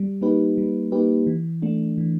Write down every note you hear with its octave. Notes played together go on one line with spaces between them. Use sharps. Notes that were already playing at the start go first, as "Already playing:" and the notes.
Already playing: G3
A#3 D#4 G4 B4
G3
A#3 D#4 G4 B4
E3
A3 D4
E3